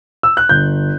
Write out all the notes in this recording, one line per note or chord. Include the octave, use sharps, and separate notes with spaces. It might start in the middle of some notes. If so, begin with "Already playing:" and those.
E6
F#6
G1 G6